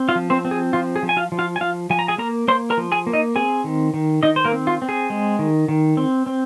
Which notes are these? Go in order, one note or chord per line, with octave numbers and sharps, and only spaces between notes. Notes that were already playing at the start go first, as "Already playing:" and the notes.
Already playing: C4
F4 F5
F3
C4 C5
C4
G#4
F3 F4
G#4
F3
G#5
F4 F5
F3
F4 F5
G#5
F3 F4 F5
F3 G#5
A#5
G#4 G#5
A#3 A#4 A#5
A#3 C5 C6
A#4 A#5
F3
G#4 G#5
A#3
D#4 D#5
C4 G#4 G#5
D#3
D#3
D#3 D#4 D#5
C5
A#3 A#4
C4
F4
C4
G#4
G#3
D#3
D#3
C4
C4